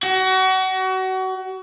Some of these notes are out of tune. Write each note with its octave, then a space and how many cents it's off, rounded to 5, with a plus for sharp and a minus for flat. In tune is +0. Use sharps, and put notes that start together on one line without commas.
F#4 +30